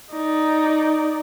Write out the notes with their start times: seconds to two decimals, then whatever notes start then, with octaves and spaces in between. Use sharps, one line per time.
0.12 D#4 D5